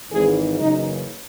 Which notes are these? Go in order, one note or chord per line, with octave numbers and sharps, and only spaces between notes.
G#1 G#2 E3 G#4
F#1 F#2 C#3 E3 D#4